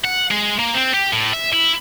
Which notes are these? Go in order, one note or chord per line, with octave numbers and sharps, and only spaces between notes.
F#5
G#3
A#3
C4
G4
A2
E5
E4